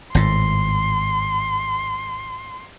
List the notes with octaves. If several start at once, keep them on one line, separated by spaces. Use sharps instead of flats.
G#1 A2 C6